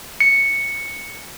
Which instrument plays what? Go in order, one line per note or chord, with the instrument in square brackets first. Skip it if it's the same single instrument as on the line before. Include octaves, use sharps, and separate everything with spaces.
[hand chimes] C#7